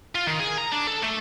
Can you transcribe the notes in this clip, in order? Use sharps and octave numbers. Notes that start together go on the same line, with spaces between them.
F4
D#3
G#4
A#5
D4
A4
A3